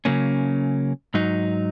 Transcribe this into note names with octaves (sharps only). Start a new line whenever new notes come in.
C#3 F#3 A#3 C#4
G#2 F#3 D#4